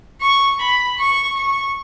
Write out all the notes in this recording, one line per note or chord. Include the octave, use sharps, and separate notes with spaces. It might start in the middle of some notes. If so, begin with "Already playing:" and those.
C#6
B5
C#6
C#6